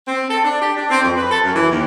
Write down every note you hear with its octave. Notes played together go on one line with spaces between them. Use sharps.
C4
A4
D4
G4
D4
C4
F2
B4
A4
F#2
E3
D#2